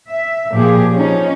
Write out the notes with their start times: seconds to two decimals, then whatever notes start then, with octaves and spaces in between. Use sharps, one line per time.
0.10 E5
0.54 A#2 F3 G4 G#4
0.95 F3 C#4 D#4